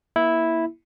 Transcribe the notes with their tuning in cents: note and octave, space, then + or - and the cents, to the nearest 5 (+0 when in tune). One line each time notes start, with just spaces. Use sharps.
A#3 +30 E4 -5